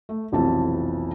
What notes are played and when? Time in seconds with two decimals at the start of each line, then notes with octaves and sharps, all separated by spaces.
0.09 A3
0.32 F1 B1 F2 E3 A5